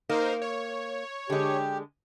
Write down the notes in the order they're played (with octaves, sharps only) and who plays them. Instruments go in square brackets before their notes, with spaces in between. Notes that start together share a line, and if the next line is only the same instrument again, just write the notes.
[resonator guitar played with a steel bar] A#3 [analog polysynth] D#4 A#4 C5
[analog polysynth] C#5
[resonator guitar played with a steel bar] D3 G#3 [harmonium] G4